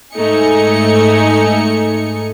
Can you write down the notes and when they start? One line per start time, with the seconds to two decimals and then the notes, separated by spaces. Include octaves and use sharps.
0.14 G#2 A3 D#4 G#5 C#7